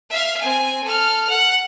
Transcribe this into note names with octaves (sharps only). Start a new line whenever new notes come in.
E5 F5
C4 G#5
A4 F6
F#5